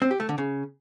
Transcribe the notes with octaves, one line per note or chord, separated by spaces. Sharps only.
C4
G4
A3
D3
C#3